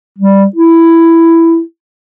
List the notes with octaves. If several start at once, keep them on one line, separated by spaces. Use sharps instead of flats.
G3
E4